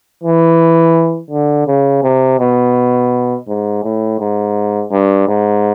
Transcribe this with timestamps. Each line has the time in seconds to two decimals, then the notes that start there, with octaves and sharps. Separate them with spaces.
0.24 E3
1.31 D3
1.67 C#3
2.03 C3
2.40 B2
3.48 G#2
3.84 A2
4.19 G#2
4.92 G2
5.28 G#2